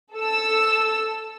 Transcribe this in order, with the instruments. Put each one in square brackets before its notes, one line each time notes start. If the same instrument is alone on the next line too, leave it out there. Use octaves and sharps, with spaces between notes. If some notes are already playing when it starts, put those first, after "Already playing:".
[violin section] A4 E6